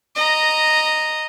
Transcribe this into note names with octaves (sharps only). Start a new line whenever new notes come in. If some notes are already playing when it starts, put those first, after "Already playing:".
D#5 A#5